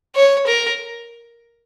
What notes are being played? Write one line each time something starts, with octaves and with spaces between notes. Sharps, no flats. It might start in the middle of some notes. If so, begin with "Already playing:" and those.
C#5
A#4